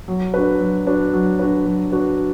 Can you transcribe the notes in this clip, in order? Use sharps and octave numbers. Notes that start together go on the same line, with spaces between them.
F#3
D4 F#4 B4
F#3
D4 F#4 B4
F#3
D4 F#4 B4
F#3
D4 F#4 B4